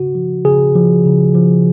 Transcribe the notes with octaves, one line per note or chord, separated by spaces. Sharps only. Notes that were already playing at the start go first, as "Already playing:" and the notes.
Already playing: C#3 F#4
F3
C#3 G#4
F3
C#3
F3